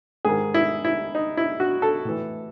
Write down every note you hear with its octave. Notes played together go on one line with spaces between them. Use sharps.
G#2 D#3 G#4
E4
E4
D#4
E4
F#4
A4
A2 E3